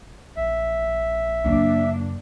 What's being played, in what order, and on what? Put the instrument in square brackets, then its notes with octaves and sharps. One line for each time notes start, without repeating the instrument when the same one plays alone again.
[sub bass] A#1 [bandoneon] E5
[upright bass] F#2 C#3 [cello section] A#3 D4